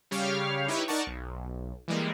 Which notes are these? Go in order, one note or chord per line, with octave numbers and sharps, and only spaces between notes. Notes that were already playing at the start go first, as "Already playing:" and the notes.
C#3 G3 G4 C#5 F5 F6
D#4 E4 G4 B4 C#5 E5
D#4 A#4 D5 F#5 A5 C#6
B1
E3 G3 G#3 A#3